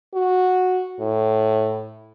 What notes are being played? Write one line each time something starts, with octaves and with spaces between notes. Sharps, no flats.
F#4
A2